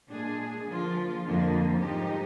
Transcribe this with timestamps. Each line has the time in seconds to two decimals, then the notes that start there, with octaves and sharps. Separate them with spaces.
0.09 A#2 G#3 D4 G#4
0.66 D3 F3 A#3 F4
1.24 F2 D3 F3 A#3
1.81 G#2 F3 G#3 D#4 G4